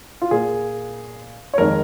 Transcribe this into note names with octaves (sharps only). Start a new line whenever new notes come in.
F4
A#2 A#3 G#4
C#5
F2 D#3 G#3 A#4